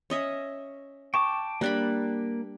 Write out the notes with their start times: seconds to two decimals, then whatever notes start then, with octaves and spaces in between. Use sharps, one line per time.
0.10 C#4 D#5 E5
1.14 G5 A5 C#6 D6
1.61 G3 A#3 D4 B5 F#6